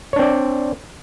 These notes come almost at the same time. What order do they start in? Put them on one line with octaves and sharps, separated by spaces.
C#5 D4 C4 D5